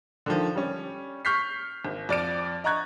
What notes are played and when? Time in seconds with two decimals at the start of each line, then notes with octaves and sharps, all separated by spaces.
0.26 D3 D#3 F3
0.56 G3 C#4
1.25 C#6 F6 G6 B6 C7
1.85 G#1
2.09 F2 D5 F6 D7
2.64 D#5 A#5 C#6 F#6 G#6 A6